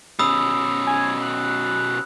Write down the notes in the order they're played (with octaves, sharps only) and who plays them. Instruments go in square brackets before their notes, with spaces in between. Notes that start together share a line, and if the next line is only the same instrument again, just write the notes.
[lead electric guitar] B2 C#4 [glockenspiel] B5 D#6 E6
[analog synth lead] G#5
F#6